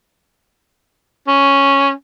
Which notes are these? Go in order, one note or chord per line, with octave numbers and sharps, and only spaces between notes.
C#4